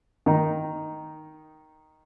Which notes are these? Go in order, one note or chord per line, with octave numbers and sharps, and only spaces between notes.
D#3 D#4